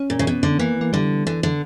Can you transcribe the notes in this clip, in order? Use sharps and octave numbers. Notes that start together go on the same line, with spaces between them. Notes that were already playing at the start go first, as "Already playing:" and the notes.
Already playing: C#4
A#2
C#3
B2
D3
E3 A#3
A#3
D3 G3
D3 E3
D3